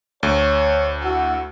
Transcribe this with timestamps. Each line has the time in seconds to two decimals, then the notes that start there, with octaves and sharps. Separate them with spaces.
0.23 D2 C#5
1.02 E4 F#4